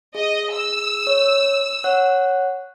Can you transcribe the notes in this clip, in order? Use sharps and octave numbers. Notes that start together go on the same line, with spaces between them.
G#4 D#5
E6
C#5
C#5 F#5 F#6